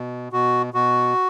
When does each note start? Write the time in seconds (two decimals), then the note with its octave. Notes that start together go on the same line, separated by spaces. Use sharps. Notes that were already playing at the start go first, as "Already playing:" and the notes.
Already playing: B2
0.32 B2 F#4
0.74 B2 F#4